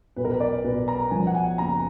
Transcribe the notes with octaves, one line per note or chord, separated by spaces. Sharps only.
B1 B4
A#4
B4
D5
B1 B4
A#5
F3 G#5
F#5
G#5
F#1 A#5